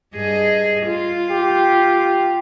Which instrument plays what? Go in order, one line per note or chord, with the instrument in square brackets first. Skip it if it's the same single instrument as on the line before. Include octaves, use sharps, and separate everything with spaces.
[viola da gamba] G2 G#4 D#5
F4
[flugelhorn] G4